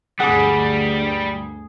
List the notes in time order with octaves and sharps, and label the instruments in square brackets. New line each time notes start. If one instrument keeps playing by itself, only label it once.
[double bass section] D2 G2 [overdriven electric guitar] G3 [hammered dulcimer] G#4 [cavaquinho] F#5 D6